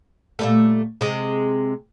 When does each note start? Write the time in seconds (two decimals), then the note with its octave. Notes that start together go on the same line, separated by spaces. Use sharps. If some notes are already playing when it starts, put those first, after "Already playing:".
0.39 A#2 G3 A3
1.01 C3 G#3